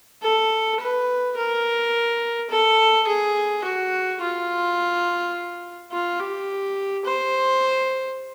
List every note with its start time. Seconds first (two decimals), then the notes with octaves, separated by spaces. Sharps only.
0.22 A4
0.80 B4
1.36 A#4
2.50 A4
3.07 G#4
3.64 F#4
4.21 F4
5.92 F4
6.20 G4
7.05 C5